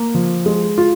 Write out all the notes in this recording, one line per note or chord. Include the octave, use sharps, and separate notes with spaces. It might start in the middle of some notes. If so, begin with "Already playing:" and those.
Already playing: A#3
F3
G#3
F4